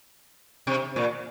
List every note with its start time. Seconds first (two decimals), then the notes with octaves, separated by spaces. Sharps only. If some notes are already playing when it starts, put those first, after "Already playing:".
0.67 C3
0.96 A#2